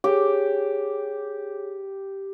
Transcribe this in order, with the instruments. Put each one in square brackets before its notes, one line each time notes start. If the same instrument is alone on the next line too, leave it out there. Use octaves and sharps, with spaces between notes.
[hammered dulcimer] G4 [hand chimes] G#4 C#5